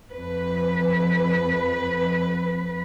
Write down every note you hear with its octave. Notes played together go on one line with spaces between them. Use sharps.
F2 B4